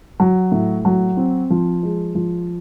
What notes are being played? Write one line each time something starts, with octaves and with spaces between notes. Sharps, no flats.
F#3
A2
F#3
C4
F3
G#3
F3